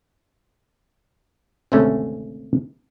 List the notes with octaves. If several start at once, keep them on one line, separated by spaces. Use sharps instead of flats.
G#1 D2 C3 A3 C#4 G#4